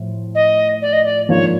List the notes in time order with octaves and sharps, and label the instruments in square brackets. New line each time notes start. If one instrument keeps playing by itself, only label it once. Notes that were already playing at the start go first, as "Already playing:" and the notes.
Already playing: [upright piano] A2 F3
[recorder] D#5
D5
D#5
D5
[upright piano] G#2 F3 A#3 D4 F4 [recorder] C#5